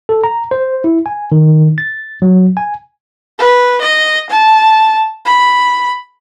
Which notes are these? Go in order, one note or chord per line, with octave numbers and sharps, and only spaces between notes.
A4
A#5
C5
E4
G#5
D#3
A6
F#3
G#5
B4
D#5
A5
B5